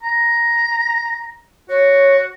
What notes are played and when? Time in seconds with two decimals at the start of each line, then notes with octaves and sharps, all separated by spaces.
0.03 A#5
1.69 F#4 C#5